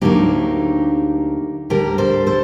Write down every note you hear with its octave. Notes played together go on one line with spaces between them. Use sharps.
D2 D3 F#3 A#3 D#4 G4
D2 D3 G3 G4 A#4
A4 C5
A4 C5